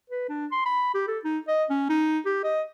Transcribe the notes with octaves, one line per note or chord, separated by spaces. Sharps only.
B4
D4
C6
B5
G4
A4
D#4
D#5
C#4
D#4
G4
D#5